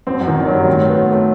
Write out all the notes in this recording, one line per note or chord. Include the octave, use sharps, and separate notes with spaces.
F#2 C4
F#2
D#3
G1
F#3 G3
A2
A3
B3
F#3
A3 B3